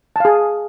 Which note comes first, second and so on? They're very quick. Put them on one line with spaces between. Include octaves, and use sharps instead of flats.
A5 F5 G#4